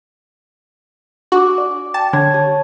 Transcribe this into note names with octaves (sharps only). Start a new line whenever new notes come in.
D4 F#4 D6
D5
G5 A5
D3 C#5 A5 G#6
G4 C#5 A5